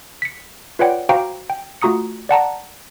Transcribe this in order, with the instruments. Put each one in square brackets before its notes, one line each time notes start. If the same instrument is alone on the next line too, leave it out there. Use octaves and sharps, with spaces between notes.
[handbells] B6 C#7
F4 B4 C#5 D5 F#5 G5
F#4 C5 F5 G5 A#5 D6
G5
A3 F4 F#4 A#5 D#6 C#7
D5 F#5 A5 A#5